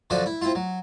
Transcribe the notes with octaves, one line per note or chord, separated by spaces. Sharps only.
F#2 D3 F3 F#4 D5
E4
C4 E4 F4
F#3